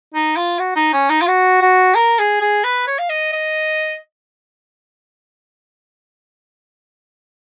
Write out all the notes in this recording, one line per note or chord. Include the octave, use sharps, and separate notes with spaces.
D#4
F4
F#4
D#4
C#4
D#4
F4
F#4
F#4
A#4
G#4
G#4
B4
C#5
F5
D#5
D#5